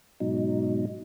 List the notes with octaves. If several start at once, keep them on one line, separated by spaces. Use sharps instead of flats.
G#2 B2 F#3 D#4